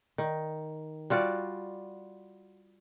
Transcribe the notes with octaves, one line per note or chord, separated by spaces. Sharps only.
D#3
G3 F4 F#4 D5